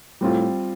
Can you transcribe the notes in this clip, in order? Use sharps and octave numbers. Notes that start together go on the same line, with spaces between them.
A2 G3 C4 F4